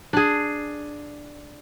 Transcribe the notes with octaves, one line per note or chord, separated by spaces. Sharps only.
D4 G#4